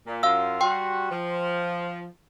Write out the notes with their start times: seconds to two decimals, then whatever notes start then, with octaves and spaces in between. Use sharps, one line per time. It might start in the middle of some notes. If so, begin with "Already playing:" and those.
0.06 A#2
0.23 F#2 F4 F5 E6
0.61 G3 F#4 G5 C6
1.10 F3